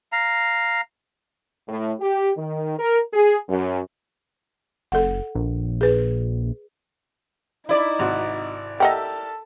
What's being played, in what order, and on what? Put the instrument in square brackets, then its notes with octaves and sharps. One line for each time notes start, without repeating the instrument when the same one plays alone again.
[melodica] F5 A#5
[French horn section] A2
G4
D#3
A#4
G#4
F#2
[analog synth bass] F#1 [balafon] A4 F#5
[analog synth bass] A#1
[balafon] G#4 B4
[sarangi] D#4 [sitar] E4 D5
[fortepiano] G#1 C3 F#4
[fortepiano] G4 A#4 E5 [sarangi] A4 [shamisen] D#5 F#5 G5